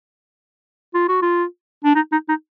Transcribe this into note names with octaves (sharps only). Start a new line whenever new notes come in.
F4
F#4
F4
D4
D#4
D#4
D#4